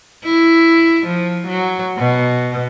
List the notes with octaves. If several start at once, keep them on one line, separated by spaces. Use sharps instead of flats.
E4
F3
F#3
B2